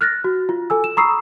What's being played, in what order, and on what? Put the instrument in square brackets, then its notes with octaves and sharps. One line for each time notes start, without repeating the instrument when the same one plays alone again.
[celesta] F6 F#6 A6 A#6
F#4
F4
A4 G#5 E6
E7
A#5 B5 C#6 D#6 E6 C7